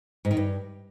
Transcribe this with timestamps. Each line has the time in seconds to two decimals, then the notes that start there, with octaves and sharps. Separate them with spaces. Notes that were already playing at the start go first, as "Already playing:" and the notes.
0.25 G#2
0.31 D#3
0.37 G2